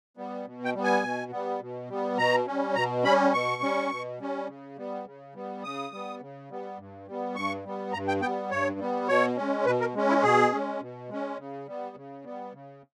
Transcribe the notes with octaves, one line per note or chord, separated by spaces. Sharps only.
G3 B3
B2
G5
G3 B3
G#5
B2
G3 B3
B2
G3 B3
B2 A#5
G3 C#4
B2 A#5
G3 C#4 B5
B2 C#6
G3 C#4
B2
G3 C#4
C#3
G3 B3
C#3
G3 B3
C#3 D#6
G3 B3
C#3
G3 B3
G2
G3 B3
G2 C#6
G3 B3
G2 A#5
G5
G3 B3 G5
G2 C#5
G3 B3
B2 C#5
G#3 C#4
B2 B4
A#4
G#3 C#4
E4
B2 G#4
G#3 C#4
B2
G#3 C#4
C#3
G3 B3
C#3
G3 B3
C#3